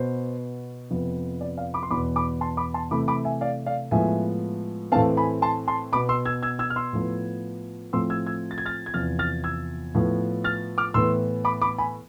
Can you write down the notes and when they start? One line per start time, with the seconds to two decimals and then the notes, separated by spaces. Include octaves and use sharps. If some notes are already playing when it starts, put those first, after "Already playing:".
Already playing: B2 B3 C5
0.90 F2 C3 F3 B3
1.41 D5
1.57 D5 F5
1.74 B5 D6
1.83 C6
1.91 E2 B2 B3 B5 D6
2.16 B5 D6
2.41 A5 C6
2.57 B5 D6
2.74 A5 C6
2.91 C3 E3 A3 B5 D6
3.08 B5 D6
3.25 E5 G#5
3.41 D5 F5
3.66 D5 F5
3.91 A2 F3 G#3 B3 E5 G#5
4.92 A2 E3 A3 C4 F5 A5
5.17 G#5 B5
5.42 A5 C6
5.68 A5 C6
5.93 B2 B3 B5 D6
6.09 C6 E6
6.25 E6 G#6
6.43 E6 G#6
6.59 E6 G#6
6.70 F6
6.76 C6 E6
6.93 A2 F3 B3
7.93 A2 F3 A3 C4 C6 E6
8.10 E6 G#6
8.27 E6 G#6
8.51 A6
8.58 G#6
8.66 F6 A6
8.86 G#6
8.94 E2 C3 F3 F6 A6
9.19 F6 A6
9.44 E6 G#6
9.95 A2 F3 B3
10.44 F6 A6
10.78 D6 F6
10.94 A2 E3 B3 C6 E6
11.45 B5 D6
11.62 B5 D6
11.78 G#5 B5